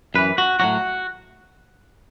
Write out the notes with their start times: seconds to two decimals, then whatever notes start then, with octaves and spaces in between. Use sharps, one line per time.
0.15 F#2 E3 B4
0.38 F#4
0.60 A2 F#3 F#4